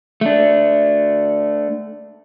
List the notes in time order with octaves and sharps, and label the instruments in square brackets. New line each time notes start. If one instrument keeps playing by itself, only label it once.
[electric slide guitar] A3 D4